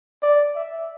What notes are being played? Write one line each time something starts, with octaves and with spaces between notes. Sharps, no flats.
D5
E5